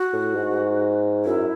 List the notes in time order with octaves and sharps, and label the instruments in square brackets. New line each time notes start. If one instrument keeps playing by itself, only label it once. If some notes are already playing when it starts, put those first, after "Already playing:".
Already playing: [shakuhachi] F#4
[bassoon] A2
G#2
[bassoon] F#2 [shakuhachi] E4